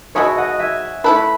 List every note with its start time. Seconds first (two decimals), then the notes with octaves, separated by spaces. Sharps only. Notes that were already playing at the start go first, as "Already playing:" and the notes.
0.15 B2 G#3 B3 F#4 C#5 E5
0.37 D#5 F#5
0.59 E5 G#5
1.04 A3 E4 B4 A5
1.16 B5